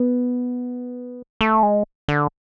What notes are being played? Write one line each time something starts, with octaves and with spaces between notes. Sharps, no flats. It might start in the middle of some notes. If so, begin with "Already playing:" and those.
Already playing: B3
A3
G#3
D3